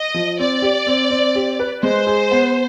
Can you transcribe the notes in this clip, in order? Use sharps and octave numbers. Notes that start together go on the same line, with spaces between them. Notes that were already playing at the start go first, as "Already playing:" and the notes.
Already playing: D#5
F3
C4 D5
G4
C4
C4
G4
B4
G#3 C5
G#4
B3